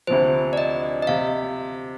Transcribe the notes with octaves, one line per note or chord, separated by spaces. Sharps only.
D2 C3 F3 C5
D5
D#5
D#5
C3 F5